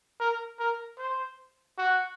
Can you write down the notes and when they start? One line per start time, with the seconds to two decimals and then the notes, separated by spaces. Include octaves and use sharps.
0.20 A#4
0.59 A#4
0.98 C5
1.78 F#4